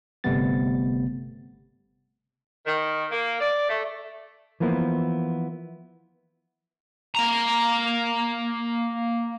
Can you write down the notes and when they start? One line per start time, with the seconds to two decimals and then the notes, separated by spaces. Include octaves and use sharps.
0.24 G1 C3 G3 A3 B3 A6
2.67 D#3
3.12 A#3
3.40 D5
3.69 A3
4.60 E3 F3 A#3 B3 E4
7.15 A#3 A#5